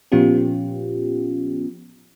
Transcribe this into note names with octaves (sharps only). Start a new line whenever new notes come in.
A#2 F3 B3 C#4 F4 G4